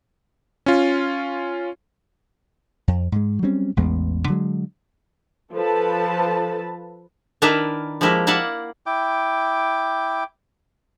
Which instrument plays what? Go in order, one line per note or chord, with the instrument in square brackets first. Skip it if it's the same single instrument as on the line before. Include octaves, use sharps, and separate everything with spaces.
[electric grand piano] C#4 F4
[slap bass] F2
G#2 G#3
F#3 G3 C4 C#4
A1 E2 G#3 B3
D3 F#3 G#3
[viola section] F3 A4 B4 A5
[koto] D#3 D4 E4 A#4 B4 A#5
F3 G#3 A#3 E4 G4
A#3 E4 D5 F5 F#5
[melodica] E4 G5 D6